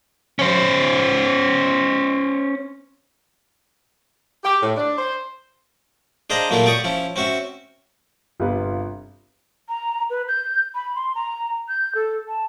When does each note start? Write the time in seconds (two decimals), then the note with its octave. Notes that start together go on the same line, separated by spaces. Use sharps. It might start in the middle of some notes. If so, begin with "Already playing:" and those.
0.39 C#4 C5
4.44 G4
4.62 A2
4.77 D4
4.97 C5
6.30 D4 G#4 C5 D#5 F5 A#5
6.50 A#2 F#3 A3 A#3 E4 F4
6.66 G4 D5 C#6 D#6
6.84 F3 C#4 E4
7.16 C4 C#4 F#4 E5
8.40 G1 C3 F4 B4
9.69 A#5
10.10 B4
10.28 G6
10.75 B5
10.95 C6
11.15 A#5
11.68 G6
11.95 A4
12.28 A5